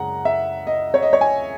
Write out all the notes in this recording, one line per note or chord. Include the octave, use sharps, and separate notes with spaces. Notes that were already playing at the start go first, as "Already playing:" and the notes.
Already playing: F#2 C#3 G#3 F#5 A#5
E5
D#5
C#5
D#5
C#5
G#5